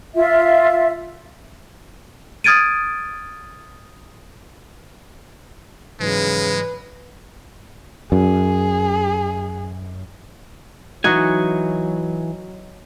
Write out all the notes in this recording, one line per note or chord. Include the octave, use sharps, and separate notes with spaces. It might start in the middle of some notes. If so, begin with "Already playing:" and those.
F4 E5
D#6 F6 G#6 A6 D7 D#7
G#2 C#3 E3 F#3 G#3 B4
F#2 G#4
E3 F#3 D#4 F#4 F#5 G#5